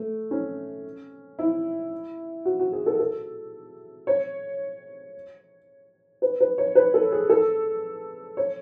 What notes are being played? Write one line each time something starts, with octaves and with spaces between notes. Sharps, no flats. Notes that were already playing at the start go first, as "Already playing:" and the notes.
Already playing: A3
C#4
E4
F#4
F#4
G#4
A4
A4
C#5
B4
B4
C#5
B4
A4
G#4
A4
C#5